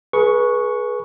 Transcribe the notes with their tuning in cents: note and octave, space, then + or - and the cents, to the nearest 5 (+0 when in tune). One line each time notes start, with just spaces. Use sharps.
G#4 +25 B4 -25 C#6 +0